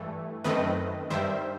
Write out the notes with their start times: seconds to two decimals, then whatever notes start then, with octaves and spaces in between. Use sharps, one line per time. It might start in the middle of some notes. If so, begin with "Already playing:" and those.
Already playing: G2 E3 A3
0.44 F#2 D#3 A3 C4 B4 D#5
1.10 G2 D#3 G3 C5 E5